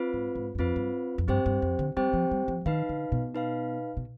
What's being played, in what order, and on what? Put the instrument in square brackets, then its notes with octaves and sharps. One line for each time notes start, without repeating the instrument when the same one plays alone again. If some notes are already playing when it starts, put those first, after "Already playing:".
Already playing: [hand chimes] C4 F4 B4
[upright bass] G#2
G#2
G2
[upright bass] F2 [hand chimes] C4 F4 B4
[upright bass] G2
F2
[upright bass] G2 [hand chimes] C4 G4 C5 G5
[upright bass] G2
F2
D3
[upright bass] G3 [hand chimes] C4 G4 C5 G5
[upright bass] F3
G3
F3
[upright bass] D#3 [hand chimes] D#4 B4 F5
[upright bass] D3
B2
[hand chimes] D#4 B4 F5
[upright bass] B2